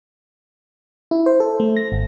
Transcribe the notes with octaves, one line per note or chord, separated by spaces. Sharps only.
E4
C5
A4
A3
A#6
G#1